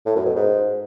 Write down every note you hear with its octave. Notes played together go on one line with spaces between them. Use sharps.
A2
F#2
B2
G#2